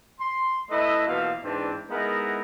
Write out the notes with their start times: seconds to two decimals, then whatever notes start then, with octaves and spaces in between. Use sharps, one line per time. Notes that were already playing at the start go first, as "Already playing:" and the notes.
0.20 C6
0.71 A3 E4 B4 D#5
1.07 B2 E3 F3 A#3 F5
1.44 G#2 E3 C4 D4
1.90 G#3 B3 D#4 E4 A#4 D#5